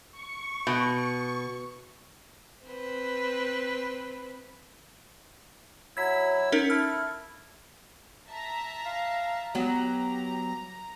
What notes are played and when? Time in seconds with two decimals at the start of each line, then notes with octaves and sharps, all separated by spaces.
0.12 C#6
0.67 B2
2.66 C4 B4
5.97 F#3 E4 E6 G#6 B6
6.52 C#4 D#4 A#4
6.70 E4 A4 F6
8.28 E5 A5 A#5
8.86 F5
9.55 F#3 B3 G4 A#5